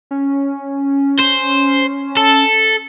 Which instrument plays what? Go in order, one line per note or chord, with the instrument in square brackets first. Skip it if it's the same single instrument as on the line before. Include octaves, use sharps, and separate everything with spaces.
[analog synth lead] C#4
[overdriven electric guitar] C5
A4